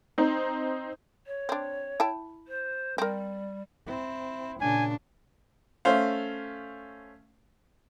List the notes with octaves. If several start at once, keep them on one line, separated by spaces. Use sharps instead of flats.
C4 D#4
C#5
C4 D4
E4 G5 A5
C5
G3 C4 A#4
C4 E4
A#2 C#3 D4 G#5
A3 C#4 C5 F5